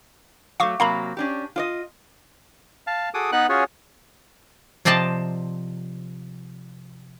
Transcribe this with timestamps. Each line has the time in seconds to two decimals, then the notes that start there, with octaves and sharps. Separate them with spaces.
0.60 F#3 A3 F5 C#6 D6
0.80 C3 F#3 A#3 F5 A#5 B5
1.17 C#4 D4 G4
1.56 F4 D5 D#5
2.87 F5 A5
3.14 F#4 G#4 A4 D6 D#6
3.32 B3 D#4 B4 F#5 F#6
3.49 C#4 F4 F#4 G#4 C#5
4.85 C3 F3 C4 D5 D#5 A5